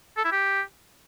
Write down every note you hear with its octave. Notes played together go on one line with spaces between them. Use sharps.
A4
E4
G4